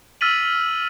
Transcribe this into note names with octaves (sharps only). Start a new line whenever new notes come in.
E6 F6 A6 B6 D#7 F#7